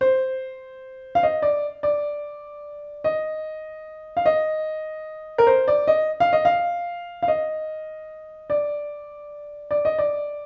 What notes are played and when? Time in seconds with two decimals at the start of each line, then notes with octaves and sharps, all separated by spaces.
0.01 C5
1.15 F5
1.23 D#5
1.42 D5
1.83 D5
3.04 D#5
4.17 F5
4.26 D#5
5.38 A#4
5.47 C5
5.68 D5
5.87 D#5
6.20 F5
6.33 D#5
6.45 F5
7.23 F5
7.28 D#5
8.50 D5
9.71 D5
9.85 D#5
9.99 D5